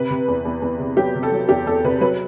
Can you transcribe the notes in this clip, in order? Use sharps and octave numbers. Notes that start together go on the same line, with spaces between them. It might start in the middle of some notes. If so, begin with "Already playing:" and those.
Already playing: C3 B4
C3
E2
E2
E2
C3
F#3 G4
C3
A4
F#3
E2 G4
E2 A4
C3 B4
F#3 B4